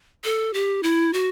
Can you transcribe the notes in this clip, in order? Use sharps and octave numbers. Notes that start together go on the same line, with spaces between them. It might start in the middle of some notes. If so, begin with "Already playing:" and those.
A4
G4
E4
F#4